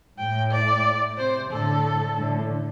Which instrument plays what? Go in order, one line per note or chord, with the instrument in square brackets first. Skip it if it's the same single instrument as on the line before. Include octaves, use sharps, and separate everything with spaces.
[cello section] A2 [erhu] G5
[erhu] D5
[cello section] C3 [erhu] C5
[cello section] A2 D3 [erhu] A4
[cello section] A2 D3